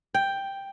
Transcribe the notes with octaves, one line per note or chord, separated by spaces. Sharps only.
G5